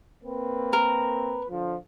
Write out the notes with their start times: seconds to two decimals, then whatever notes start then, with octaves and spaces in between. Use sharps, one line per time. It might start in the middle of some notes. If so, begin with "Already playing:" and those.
0.23 A#3 C4 B4
0.73 A#4
1.49 D3 F3